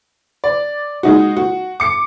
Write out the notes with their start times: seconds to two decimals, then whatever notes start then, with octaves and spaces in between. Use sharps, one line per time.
0.44 D5
1.03 G#3 D#4 F#4
1.37 F#4
1.80 D6 C#7